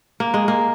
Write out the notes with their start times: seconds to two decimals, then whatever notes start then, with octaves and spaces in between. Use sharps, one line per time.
0.20 A#3
0.34 G#3
0.48 A#3